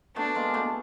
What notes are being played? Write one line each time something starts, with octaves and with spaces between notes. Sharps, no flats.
A3 B3 D4
G#3 A#3
A3 B3